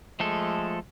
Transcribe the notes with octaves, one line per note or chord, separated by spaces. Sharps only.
F3 G#3 A3 A4